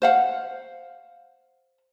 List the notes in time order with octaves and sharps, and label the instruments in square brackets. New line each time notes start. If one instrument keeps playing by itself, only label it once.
[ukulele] C5 F5 F#5